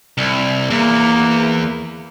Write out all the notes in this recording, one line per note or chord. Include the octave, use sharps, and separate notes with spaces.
C2
E2 A#3